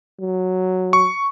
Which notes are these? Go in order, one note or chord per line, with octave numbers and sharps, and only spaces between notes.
F#3
C#6